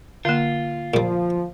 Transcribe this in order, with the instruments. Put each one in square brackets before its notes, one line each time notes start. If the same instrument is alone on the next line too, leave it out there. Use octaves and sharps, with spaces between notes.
[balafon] D3 A#3 [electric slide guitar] F4
[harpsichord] A#2 G3 [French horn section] F3